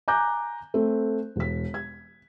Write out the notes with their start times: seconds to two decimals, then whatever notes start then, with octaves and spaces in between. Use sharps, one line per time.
0.08 G#5 A#5 D6 F#6 G6
0.74 A3 C4
1.36 E1 B6
1.74 G#6